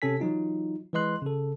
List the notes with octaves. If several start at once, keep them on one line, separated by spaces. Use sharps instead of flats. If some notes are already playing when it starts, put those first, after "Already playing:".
C3 C#4 A4 G#5 B6
E3 F#3 D#4 F4
E3 G#3 B4 D#5 C6 F#6
C#3 A4